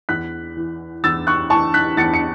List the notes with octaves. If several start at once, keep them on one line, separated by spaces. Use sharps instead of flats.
E2 F#6 B6
E3
E2 E6 A6
C#6 F#6
E3 A5 C#6
F#6 B6
E2 A6 C#7
C#7